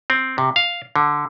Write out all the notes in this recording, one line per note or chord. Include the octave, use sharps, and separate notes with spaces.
C4
C3
F5
D3